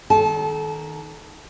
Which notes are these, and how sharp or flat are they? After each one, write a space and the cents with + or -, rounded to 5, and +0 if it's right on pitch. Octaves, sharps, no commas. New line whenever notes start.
D#3 +0 A4 -30 A5 -25